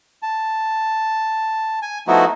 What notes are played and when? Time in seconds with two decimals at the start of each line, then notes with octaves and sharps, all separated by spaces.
0.23 A5
1.82 G#5
2.08 F3 A3 B3 D#4 E4 F#4